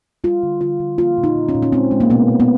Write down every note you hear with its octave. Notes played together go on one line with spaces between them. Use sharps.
G3 F4
D3
D3 F4
D3
A#3 F4
A#2
D#4
A#2
C#4
A#2
C#4
G#3 C4
G#3
A#3
B2 B3
B2
B3